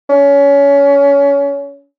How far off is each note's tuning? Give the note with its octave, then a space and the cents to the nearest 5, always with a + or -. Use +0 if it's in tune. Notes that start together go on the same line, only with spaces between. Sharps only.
C#4 +25